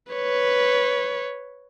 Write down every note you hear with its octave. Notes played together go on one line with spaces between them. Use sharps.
B4 C#5